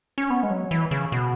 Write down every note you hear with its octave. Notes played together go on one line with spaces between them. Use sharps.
C#4
B3
G#3
F#3
E3
C#3
B2